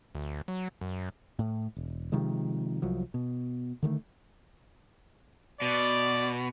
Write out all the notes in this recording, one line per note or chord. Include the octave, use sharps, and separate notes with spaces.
D2
F#3
F#2
A2
E1
C3 D#3 F3 G#3
C2 F3 F#3
B2
D3 D#3 G#3 A3
B2 D5